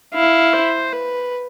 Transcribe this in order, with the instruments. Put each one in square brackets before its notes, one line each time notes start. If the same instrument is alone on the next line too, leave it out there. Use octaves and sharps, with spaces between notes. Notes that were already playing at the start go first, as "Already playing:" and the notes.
[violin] E4 [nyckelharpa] F5
[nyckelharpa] C5
B4